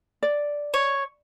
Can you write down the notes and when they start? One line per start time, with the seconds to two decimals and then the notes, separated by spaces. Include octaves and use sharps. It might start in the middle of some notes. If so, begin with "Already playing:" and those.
0.23 D5
0.74 C#5